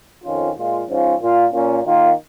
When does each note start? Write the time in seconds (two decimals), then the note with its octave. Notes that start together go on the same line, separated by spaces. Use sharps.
0.24 F2 D#3 C#4 F4
0.57 A#2 G#3 F4
0.88 G#2 F3 C#4 F4
1.21 A#2 A#3 F4
1.53 A#2 A#3 C#4 F4
1.86 D#3 A#3 F4